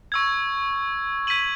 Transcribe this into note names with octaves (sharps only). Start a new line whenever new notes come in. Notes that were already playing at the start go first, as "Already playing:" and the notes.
C#6 E6 G#6
G#6 B6 D#7 F#7